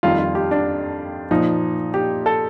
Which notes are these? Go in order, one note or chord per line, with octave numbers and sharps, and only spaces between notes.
F2 D#3 G3 F4
F4
G4
D4
A#2 F3 D#4
G4
A4